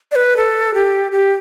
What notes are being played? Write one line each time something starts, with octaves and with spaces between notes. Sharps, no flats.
D5
B4
A4
G4
G4